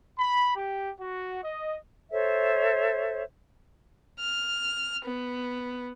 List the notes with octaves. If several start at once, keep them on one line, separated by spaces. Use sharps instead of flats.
B5
G4
F#4
D#5
A4 C5 C#5 E5
F6
B3